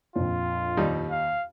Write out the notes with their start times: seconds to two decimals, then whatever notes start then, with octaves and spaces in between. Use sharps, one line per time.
0.16 A#1 F2 F4
0.77 D#2 G3 D#4
1.11 F5